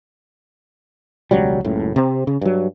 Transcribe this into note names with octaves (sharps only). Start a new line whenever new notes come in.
E1 C#2 F#3 G3
F#1 C#2 A2
C3 C4
C#3
G2 F#3